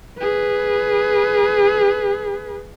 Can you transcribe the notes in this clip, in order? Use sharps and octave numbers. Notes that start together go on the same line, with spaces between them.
G#4 B4